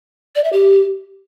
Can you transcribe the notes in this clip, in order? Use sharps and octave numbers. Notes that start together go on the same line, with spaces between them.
D5
E5
G4